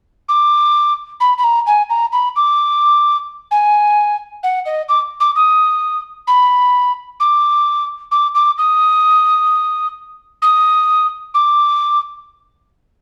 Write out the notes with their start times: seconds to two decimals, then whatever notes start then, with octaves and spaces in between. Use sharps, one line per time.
0.29 D6
1.20 B5
1.38 B5
1.44 A#5
1.67 G#5
1.90 A#5
2.12 B5
2.36 D6
3.51 G#5
4.43 F#5
4.66 D#5
4.89 D6
5.20 D6
5.36 D#6
6.27 B5
7.20 D6
8.11 D6
8.35 D6
8.58 D#6
10.42 D#6
11.34 D6